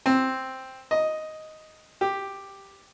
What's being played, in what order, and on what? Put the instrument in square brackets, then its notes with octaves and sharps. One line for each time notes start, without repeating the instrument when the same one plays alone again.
[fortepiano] C4
D#5
G4